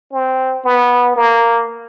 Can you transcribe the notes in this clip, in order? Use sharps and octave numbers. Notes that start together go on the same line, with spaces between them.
C4
B3
A#3